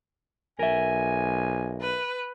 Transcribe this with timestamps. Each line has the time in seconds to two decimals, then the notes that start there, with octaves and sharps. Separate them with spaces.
0.59 B1 A#4 E5 G#5
1.82 B4